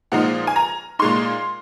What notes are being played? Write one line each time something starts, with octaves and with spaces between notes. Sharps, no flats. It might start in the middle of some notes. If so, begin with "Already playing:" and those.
A#2 F3 G#3 D#4 F#5
G#5
A#5
A#2 G#3 D#4 C6